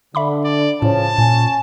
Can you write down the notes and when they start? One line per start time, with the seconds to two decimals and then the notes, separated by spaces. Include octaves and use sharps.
0.15 D3 E5 B5 D6
0.44 D5
0.82 A2 C#3 F3 C#4 A5
1.18 A#2 C#4 G#5